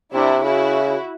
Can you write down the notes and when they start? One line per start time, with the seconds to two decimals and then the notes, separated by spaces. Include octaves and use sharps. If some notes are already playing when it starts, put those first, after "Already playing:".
0.13 C3 D4 E4
0.43 C#3 E4 F#4